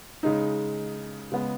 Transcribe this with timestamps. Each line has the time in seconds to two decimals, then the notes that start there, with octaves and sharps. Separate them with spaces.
0.23 C#3 G#3 D#4
1.32 C#3 G#3 B3